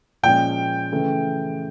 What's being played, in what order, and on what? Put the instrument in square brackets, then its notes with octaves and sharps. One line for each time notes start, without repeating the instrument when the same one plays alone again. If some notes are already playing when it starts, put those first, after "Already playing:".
[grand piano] A#2 F3 G#3 C#4 [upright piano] G5
[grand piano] C#3 E3 A3